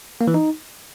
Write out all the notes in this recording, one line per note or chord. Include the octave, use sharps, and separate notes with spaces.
A#3
E3
D#4